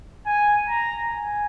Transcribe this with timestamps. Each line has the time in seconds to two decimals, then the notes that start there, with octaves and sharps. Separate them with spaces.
0.26 G#5
0.69 A#5
1.11 G#5